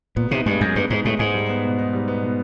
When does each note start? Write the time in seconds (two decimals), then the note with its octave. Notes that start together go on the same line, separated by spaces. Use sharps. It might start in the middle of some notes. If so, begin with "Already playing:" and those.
0.16 A#2 B3
0.31 C3 D#4
0.46 G2 G#3
0.61 F#2 G#4
0.75 G2 B3
0.90 G#2 D#4
1.05 A2 G#3
1.19 G#2 G#4
1.34 G3
1.49 B3
1.64 B2
1.78 D#4
1.93 G3
2.08 B3
2.23 B2